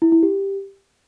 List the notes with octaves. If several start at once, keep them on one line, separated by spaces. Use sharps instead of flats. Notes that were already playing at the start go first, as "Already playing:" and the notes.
E4
E4
G4